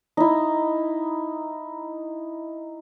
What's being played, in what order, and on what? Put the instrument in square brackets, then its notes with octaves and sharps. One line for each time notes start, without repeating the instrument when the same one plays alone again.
[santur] D#4 E4